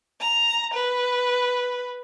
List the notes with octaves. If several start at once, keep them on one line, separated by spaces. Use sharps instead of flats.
A#5
B4